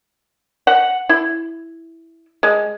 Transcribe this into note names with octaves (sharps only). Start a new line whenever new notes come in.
F#5
E4
G#3